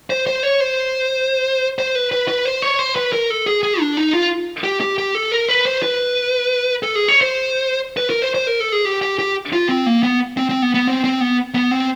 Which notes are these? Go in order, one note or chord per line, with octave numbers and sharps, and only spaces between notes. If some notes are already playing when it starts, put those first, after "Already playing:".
C5
C5
C#5
C5
C5
B4
B4
B4
C5
C#5
C5
B4
A#4
A4
G#4
G#4
D4
D#4
F4
G4
G4
G4
A4
A#4
B4
C5
B4
A4
G#4
C#5
C5
B4
A#4
C5
C5
A#4
A4
G#4
G4
G4
G4
F4
C4
A#3
B3
C4
C4
B3
B3
C4
C4
B3
B3
C4